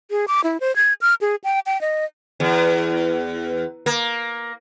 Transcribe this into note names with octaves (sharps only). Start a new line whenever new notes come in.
G#4
D6
E4
C5
G#6
F6
G#4
G5
G5
D#5
E2
A#3